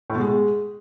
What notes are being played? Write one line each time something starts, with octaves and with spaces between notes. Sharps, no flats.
A2
B2
G#3